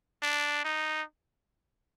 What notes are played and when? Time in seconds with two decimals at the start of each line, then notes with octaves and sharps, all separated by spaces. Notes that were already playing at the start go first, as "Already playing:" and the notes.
0.23 D4
0.64 D#4